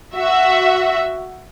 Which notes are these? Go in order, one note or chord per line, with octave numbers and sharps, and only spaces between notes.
F#4 E5